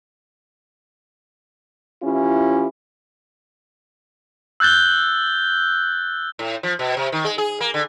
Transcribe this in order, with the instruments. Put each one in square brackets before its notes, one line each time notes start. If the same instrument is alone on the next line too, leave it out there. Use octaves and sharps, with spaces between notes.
[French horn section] E3 C#4 E4 F4 G4
[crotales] E6 F#6 G6 A6 G7
[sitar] A2
F3
B2
C3
D#3
G#3
G#4
A#3
D3